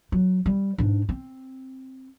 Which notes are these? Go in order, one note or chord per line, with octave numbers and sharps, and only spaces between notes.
F#3
G3
G#2 D4
C4